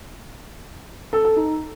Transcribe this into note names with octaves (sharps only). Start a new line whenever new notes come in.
A4
A4
D#4